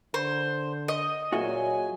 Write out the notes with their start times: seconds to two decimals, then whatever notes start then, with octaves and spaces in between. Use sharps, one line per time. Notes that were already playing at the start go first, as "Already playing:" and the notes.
0.14 D3 C5
0.88 D#5
1.32 A#2 F#3 F#4 G#4 E5 G#5